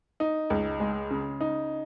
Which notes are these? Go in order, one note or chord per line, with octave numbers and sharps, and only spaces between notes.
D#4
C#2
G#3
C#3
D#4